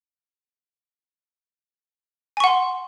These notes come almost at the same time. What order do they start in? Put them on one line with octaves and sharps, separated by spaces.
G#5 C#6 F#5 C6